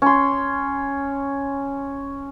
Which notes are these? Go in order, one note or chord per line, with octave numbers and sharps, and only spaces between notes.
C#4 C6